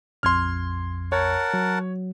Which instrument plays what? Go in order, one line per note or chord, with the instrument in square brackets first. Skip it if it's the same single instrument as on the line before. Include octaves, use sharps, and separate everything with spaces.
[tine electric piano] A#1 F2 G#6 [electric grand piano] C6 F6
[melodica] A#4 F#5 A5 [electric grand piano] C#5
[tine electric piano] F#3